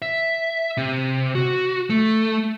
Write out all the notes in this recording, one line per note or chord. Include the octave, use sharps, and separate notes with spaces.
E5
C3
F#4
A3